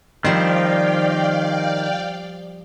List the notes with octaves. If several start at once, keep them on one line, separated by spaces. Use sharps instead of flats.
D#3 F3 G3 C4 D5 F5 G5